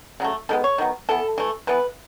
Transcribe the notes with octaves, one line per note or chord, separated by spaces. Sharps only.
C#3 F#3 A3
D#3 G#3 B3 A4
C#5
D#3 F#3 B3
E3 B3 A4
E3 A3
E3 B3 B4